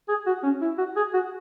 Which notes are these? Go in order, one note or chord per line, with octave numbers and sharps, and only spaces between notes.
G#4
F#4
C#4
E4
F#4
G#4
F#4